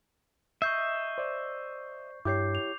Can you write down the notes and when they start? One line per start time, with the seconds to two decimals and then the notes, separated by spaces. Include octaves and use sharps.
0.62 D#5 E5 C#6 G6 C7
1.18 C5 D5
2.25 G2 E4 G4 C#5 D6 G6 C7
2.55 F7